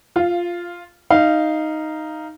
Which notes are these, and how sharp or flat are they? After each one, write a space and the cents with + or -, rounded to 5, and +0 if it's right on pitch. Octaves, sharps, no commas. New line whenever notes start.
F4 +0 F5 -20
D#4 +0 F5 -15